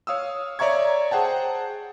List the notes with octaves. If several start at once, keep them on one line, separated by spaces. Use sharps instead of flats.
C#5 F5 D#6 E6
C#5 D5 E5 A#5 C#6 G#6
G#4 C5 F#5 G5 A5